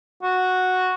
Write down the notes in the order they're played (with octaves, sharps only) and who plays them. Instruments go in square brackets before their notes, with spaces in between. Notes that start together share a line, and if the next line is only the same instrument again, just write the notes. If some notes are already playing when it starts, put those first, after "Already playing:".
[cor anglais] F#4